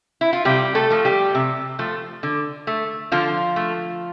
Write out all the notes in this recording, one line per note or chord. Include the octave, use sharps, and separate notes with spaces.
E4
F4
C3 G3 G4
A3 A4
F3 A3
G3 G4
C3
F3 A3
D3
A3
D3 F3 F4
A3